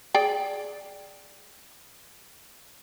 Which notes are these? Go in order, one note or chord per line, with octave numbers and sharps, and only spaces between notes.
G#4 D5 G5